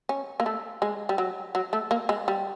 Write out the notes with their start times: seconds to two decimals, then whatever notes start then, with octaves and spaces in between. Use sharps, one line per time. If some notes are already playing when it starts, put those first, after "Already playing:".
0.09 C#4
0.40 A#3
0.46 A3
0.82 G#3
1.09 G3
1.18 F#3
1.55 F#3
1.73 A3
1.91 A#3
2.09 G#3
2.28 G3